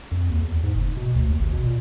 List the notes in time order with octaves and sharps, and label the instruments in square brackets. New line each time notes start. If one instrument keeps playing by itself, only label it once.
[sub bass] F2
D#2
E2
G#2
F#1
B2
D2
D#2
G#1
B2
A#2